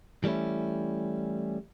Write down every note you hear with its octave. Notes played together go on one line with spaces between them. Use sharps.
E3 G3 A3 C#4 E4